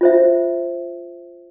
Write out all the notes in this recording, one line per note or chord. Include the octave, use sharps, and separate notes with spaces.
F4 C5 E5